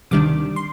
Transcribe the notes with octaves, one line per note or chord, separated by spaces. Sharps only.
D2 C3 D#3 G3 D4 D6
C6